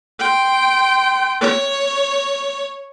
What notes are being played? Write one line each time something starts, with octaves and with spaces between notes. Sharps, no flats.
G5 C6
C#5